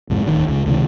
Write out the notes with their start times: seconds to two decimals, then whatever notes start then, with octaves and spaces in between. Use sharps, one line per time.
0.10 C2 F2 G#2
0.26 D1 D#2 D#3
0.48 C#2 C#3
0.66 C#2 C3 D#3